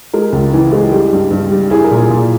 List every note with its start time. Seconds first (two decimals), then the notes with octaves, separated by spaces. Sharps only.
0.14 G#3 A#4
0.33 C#2
0.53 E3
0.73 G#3
0.91 G3 G4
1.12 G2
1.31 G2
1.51 G3
1.70 E4 G#4
1.84 A#4
1.91 A#2
1.97 G#4
2.10 A#2